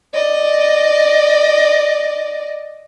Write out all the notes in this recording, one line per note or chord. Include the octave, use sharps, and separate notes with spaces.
D5 D#5